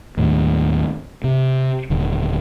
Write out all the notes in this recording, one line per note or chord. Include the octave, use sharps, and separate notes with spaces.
D#2 A2
C3
D#1 D3